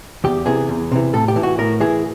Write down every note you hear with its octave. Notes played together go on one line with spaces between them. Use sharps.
E2 G4
C3 E3 G#4
E2
C3 E3
A2 A4
G4
E3
F#4
A2 A#4
E3 G#4